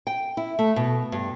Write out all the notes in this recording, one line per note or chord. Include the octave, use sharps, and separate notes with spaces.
G5
E4
A3
B2
G2